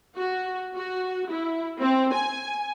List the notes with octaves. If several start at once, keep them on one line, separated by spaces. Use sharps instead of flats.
F#4
F#4
E4
C4
G#5